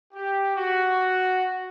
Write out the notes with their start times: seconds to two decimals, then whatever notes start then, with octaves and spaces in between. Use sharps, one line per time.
0.14 G4
0.56 F#4